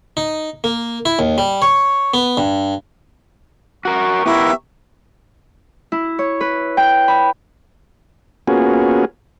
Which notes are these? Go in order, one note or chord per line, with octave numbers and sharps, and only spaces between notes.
D#4
A#3
E4
D#2
G3
C#5
B3
G2
F#4 A#4 C#6
B3 E4 G4 A#4 E5
E4
C#5
B4
G5
B5
A#3 B3 C#4 F4 F#4 G#4